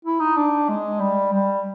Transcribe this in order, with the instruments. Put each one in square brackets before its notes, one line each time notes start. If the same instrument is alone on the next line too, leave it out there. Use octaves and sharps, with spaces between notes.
[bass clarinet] E4
D#4
D4
G#3
G3
G3